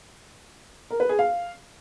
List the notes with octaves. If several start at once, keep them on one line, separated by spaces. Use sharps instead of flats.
A#4
B4
G#4
F5